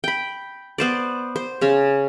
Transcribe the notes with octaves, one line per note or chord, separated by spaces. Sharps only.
G5 B5
B3 C5 D5
C5
C#3 C#4